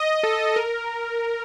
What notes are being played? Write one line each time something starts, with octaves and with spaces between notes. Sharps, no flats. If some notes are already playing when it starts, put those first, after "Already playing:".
Already playing: D#5
A4
A#4